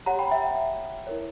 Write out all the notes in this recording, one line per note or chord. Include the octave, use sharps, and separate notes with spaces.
G4 C#5 F#5 A#5
G5 B5
E5 G5
E4 A#4 C#5